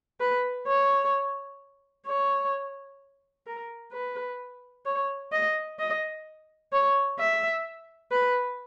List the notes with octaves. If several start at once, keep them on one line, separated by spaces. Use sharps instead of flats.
B4
C#5
C#5
A#4
B4
C#5
D#5
D#5
C#5
E5
B4